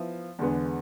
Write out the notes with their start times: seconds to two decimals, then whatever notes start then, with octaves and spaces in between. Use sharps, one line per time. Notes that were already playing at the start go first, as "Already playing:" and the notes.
Already playing: F3 B3 E4
0.39 E2 D3 G#3 B3